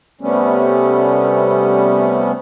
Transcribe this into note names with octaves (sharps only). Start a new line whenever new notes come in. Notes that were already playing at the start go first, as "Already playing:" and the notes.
C3 G3 A3 B3 C#4